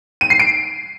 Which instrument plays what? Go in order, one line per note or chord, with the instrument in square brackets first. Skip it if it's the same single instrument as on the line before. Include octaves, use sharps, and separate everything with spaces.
[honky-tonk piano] D#7
C7
D7